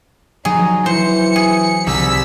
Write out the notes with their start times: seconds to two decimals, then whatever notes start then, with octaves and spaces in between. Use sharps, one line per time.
0.45 F#3 D#4 G#4
0.86 E3 C5 C#7
1.36 G#4
1.87 C2 E6 B6